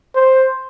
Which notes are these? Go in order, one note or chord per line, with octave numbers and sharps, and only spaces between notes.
C5